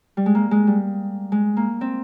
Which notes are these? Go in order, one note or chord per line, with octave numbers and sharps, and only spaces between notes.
G3
G#3
A#3
G#3
G3
G#3
A#3
C4